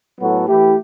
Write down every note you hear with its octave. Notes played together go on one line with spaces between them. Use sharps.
A2 F#3 B3 F#4 A4
E3 A3 E4 G4